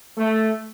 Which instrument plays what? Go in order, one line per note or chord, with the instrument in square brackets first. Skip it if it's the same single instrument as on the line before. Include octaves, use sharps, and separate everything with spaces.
[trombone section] A3